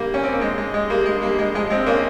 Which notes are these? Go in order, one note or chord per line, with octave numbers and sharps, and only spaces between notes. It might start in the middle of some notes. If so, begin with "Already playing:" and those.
Already playing: G3 A#3
C#4
C4
A#3
G#3
G#3
G#3
G3 A#3
G#3
G3 A#3
G#3
G2 F3 G#3
G#3 C4
A#3 C#4